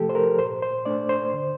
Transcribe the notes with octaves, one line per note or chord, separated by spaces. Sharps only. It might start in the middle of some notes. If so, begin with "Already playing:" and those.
Already playing: C3 F3 A3 G4 A4
C5
A#4
A#2 C5
C5
A3 D4 D5
C5
D3